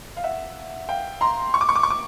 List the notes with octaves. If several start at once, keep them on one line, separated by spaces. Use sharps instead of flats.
F5
E5 F#5
F5 G5
A#5 C6
C#6
D6
C#6
D6
C#6
D6